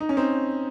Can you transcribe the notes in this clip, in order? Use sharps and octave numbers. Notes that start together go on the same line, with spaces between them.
D#4
C#4
C4 D#4